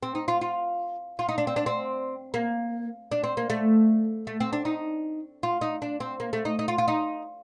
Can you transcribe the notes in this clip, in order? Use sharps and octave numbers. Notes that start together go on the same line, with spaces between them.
C4
D#4
F4
F4
F4
D#4
D4
C4
D4
C4
A#3
D4
C4
A#3
A3
A3
C4
D4
D#4
F4
D#4
D4
C4
A#3
A3
D#4
D#4
F4
F4
D#4